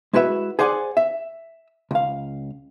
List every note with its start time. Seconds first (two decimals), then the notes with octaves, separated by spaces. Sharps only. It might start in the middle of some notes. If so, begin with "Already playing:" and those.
0.13 G#3 E4 F#4 B4 E5
0.59 G#4 C5 D5 F#5 G#5
0.97 E5
1.91 C#2 F5